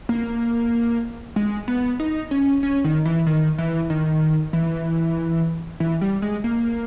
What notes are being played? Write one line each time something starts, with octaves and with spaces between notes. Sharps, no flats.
A#3
G#3
B3
D#4
C#4
C#4
D#3
E3
D#3
E3
D#3
E3
E3
G3
G#3
A#3